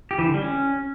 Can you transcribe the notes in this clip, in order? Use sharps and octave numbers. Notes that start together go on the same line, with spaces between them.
G4
E3
D3
G3
C#4